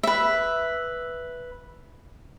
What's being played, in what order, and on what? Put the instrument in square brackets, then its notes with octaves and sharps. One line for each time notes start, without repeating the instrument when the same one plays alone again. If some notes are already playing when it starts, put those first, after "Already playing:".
[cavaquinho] B4 E5